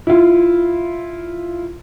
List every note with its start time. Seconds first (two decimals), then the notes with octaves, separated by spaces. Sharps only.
0.07 E4 F4